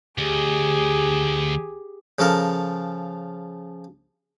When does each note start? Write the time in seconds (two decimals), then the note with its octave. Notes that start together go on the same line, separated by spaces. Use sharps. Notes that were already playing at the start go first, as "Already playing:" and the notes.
0.18 D2 G4 G#4
2.19 C#3 F3 A4 A#4